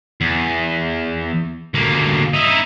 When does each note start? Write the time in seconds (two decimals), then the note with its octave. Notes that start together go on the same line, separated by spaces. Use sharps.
0.21 E2
1.74 D2 A#3
2.33 D#4 E4